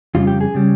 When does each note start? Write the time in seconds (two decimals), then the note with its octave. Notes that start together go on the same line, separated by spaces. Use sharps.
0.15 F2 C#3 G3 F4
0.27 G4
0.41 G#4
0.54 C#3 G3